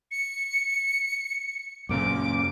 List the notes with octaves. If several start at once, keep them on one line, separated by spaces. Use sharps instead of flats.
C#7
F#2 A#2 C#3 D6